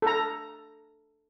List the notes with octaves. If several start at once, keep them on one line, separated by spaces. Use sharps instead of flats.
A4 A#5